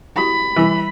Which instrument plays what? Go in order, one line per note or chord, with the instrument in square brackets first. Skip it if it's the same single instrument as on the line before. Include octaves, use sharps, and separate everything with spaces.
[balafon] E4 F#4 G4 [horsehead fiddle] B5
[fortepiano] E3 [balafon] G3